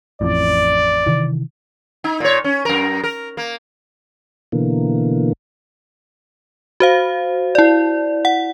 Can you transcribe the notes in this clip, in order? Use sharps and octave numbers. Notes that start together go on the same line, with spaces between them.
A1 F2 A2 D5
C3 D#3 E3
D#4
A#2 C#5
C#4
F#2 A#4
A#4
A#3
B2 D3 E3 A#3
F#4 C5 F5
E4 D5
F#5